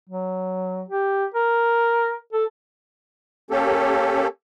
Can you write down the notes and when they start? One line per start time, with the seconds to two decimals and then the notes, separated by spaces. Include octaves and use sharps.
0.10 F#3
0.89 G4
1.35 A#4
2.33 A4
3.51 A#3 C#4 G4 A4